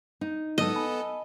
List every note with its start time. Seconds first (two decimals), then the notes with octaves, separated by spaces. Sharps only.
0.21 D#4
0.58 G#2 F#3 G#3 B3 A4 D#5
0.76 G#5 A5 B5